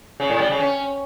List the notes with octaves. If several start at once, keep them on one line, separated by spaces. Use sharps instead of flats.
C#3
A2
G3
C#3
C#4